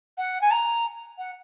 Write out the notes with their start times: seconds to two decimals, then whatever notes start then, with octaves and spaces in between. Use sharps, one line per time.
0.17 F#5
0.41 G#5
0.51 A#5
1.18 F#5